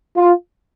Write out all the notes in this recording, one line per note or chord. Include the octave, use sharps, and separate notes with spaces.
F4